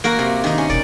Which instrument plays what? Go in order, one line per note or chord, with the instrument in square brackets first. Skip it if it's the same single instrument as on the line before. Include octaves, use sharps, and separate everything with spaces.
[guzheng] A#3 F#4 A#4
C3
D#3 D#4
C#4
[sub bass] E1 [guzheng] D5